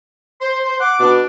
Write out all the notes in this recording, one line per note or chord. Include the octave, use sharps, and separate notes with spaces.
C5 C6
C5
F#5 D6
B2 D4